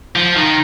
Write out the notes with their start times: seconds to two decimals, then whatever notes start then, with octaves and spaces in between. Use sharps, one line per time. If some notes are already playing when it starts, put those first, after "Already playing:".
0.16 F3
0.36 D#3